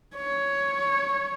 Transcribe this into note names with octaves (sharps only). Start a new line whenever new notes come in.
C#5